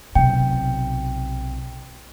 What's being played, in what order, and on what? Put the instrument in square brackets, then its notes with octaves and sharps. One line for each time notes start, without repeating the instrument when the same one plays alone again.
[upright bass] B1 C3 [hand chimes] G5